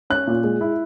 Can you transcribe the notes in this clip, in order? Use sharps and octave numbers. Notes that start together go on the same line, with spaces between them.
C#4 F#6
A#2
G#3
E4